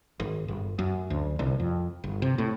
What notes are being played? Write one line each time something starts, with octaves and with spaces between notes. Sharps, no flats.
G#1
G1
F#2
D2
C2
F2
G1
C3
A2